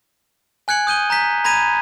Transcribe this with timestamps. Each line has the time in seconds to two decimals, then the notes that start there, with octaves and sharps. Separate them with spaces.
0.68 G#5 F#6 G#6 C#7 F#7
0.87 D#6 G6 D#7 G7
1.10 A#5 G6 B6
1.44 A#5 B5 G#6 A#6 D#7